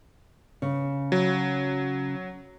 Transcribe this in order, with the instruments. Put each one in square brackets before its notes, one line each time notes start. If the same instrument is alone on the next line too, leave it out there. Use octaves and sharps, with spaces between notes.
[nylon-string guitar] C#3
[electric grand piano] F#3